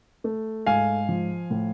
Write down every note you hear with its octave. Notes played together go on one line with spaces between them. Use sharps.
A3
G#2 F5 G#5
F3
A2